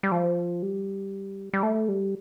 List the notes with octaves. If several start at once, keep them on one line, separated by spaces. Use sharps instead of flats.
G3
F3
G3
G3
A3
G3